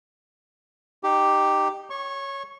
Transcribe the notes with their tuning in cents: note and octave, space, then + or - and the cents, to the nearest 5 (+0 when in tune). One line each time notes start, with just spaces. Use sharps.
D#4 -25 G4 +0
C#5 +0 C#6 -25